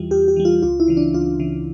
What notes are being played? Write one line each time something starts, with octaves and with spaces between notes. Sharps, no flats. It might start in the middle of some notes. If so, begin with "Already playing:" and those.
Already playing: E2 E3 G3 F4
E2 G4
G4
E3 G3
F4
C#2 F4
E4
C#3 E3
D4
C#2 F4
C#3 E3